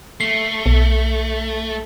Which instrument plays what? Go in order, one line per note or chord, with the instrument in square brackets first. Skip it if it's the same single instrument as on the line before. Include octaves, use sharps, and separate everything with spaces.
[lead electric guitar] A3 [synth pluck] C7
[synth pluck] B1